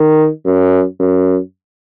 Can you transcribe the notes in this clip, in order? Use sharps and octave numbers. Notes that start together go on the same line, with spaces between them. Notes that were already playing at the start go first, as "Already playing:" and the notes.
Already playing: D#3
F#2
F#2